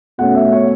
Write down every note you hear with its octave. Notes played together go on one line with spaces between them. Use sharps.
B2 A3 C#4 F#5
E5
C#5